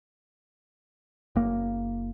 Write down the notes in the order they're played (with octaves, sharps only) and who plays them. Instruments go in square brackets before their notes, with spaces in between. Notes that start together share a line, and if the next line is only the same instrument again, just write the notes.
[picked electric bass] F#1 A#3